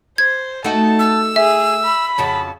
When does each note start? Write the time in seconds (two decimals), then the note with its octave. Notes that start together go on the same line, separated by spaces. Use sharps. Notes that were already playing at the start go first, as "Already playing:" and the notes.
0.18 C5 G#6
0.64 A3 D#4 F#4 A5
0.99 E6
1.36 G#4 E5
1.84 B5
2.18 F2 C#3 F#4 A5